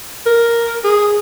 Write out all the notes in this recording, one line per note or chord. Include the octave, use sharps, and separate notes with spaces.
A#4
G#4